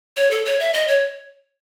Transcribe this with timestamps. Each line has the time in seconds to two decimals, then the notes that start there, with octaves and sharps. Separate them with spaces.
0.17 C#5
0.31 A4
0.45 C#5
0.60 E5
0.73 D#5
0.88 C#5